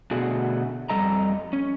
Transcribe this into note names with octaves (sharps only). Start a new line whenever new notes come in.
B2 D3 A3 F#4 G#4
F2 G3 A4 D#5 A#5
C#4